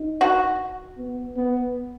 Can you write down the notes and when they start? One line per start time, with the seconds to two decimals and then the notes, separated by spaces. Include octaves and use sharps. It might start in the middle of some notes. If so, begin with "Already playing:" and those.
Already playing: D#4
0.21 F#4
0.98 B3
1.37 B3